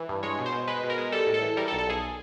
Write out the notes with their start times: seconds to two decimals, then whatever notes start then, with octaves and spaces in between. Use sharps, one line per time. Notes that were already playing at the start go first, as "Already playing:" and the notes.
Already playing: E3
0.09 G2
0.23 G#3 C#5
0.39 B2
0.46 C5
0.53 B2
0.68 G#3 B4
0.83 B2
0.90 A#4
0.98 G#3
1.12 G3 A4
1.27 A2
1.34 A4
1.42 E3
1.57 G3 A#4
1.68 A4
1.72 B1
1.78 A4
1.87 B1 G#4